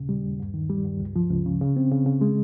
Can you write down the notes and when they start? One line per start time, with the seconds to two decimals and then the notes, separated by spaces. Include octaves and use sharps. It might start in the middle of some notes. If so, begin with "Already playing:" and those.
Already playing: D#2 A#2 C#3
0.09 G3
0.24 D#2
0.40 G2
0.54 D#3
0.70 G3
0.85 G2
1.00 C#2
1.16 F3
1.30 C#2
1.46 C#3
1.61 C#3
1.76 C4
1.92 C#3
2.06 C#3
2.21 G#3